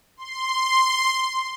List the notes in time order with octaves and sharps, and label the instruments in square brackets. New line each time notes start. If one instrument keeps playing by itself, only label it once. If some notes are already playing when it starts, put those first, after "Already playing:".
[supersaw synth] C6